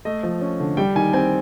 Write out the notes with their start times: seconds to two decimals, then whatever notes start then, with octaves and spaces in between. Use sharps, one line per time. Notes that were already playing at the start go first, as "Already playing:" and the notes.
0.05 A3 D#5
0.23 F3
0.41 C#4
0.60 D3
0.77 G3 G5
0.95 D#3 G#5
1.13 C4 G#5